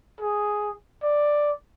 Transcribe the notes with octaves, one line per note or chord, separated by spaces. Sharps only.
G#4
D5